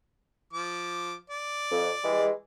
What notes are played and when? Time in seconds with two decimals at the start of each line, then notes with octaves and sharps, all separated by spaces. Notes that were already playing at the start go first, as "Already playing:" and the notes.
0.53 F3 D6
1.30 D5
1.71 F2
2.04 E3 G3 G#3